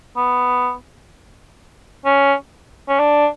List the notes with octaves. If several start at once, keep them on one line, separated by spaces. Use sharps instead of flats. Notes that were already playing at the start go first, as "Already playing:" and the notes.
B3
C#4
C#4
D4